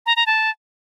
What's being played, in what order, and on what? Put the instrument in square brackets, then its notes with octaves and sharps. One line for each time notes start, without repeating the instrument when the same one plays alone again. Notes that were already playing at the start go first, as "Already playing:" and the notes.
[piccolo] A#5
A#5
A5